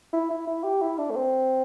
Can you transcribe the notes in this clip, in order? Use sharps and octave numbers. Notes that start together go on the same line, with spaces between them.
E4
E4
E4
G4
E4
D4
A3
C4